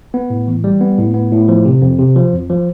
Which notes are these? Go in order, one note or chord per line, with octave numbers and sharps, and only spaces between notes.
B3
A2
E3
G3
B3
A2
B3
A2
F3
C3
F2
C3
F3
F2
F3